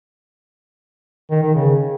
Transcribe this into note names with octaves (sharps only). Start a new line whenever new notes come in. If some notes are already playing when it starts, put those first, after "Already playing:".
D#3
D#3
C#3